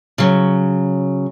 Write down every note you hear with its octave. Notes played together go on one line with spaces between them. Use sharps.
C#3 F#3